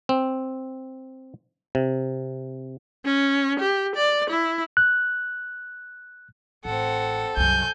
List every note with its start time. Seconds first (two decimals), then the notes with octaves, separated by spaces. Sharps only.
0.09 C4
1.75 C3
3.05 C#4
3.59 G4
3.96 D5
4.30 E4
4.77 F#6
6.65 A1 C4 A4 F#5
7.37 C2 F#2 G#5 G6